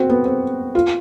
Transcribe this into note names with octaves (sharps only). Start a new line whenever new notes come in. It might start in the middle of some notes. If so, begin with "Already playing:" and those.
Already playing: C4 F#4
B3
C4
F4